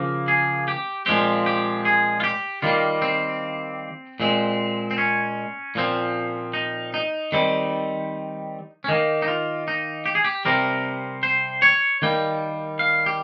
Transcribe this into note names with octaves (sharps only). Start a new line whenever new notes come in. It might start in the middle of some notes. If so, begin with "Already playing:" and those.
Already playing: C#3 F3 A#3
G#4
G4
A#2 F3 G#3 C4 G4
G4
G#4
F4
G4
D#3 G3 A#3 F4
C4
A#2 G#3 C4
C4
C#4
A#2 F3 C4
D#4
D#4
D#3 G3 C4
C#4
D#3 A#3 D#4
D#4
F4
D#4
G4
G#4
G4
C3 G3 C4 A#4
C5
C#5
D#3 G3 A#3 G5
F5
G4